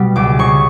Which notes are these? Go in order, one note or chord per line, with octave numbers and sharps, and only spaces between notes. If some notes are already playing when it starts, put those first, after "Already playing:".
Already playing: B2 G3
C#2 D6
C#3 C#6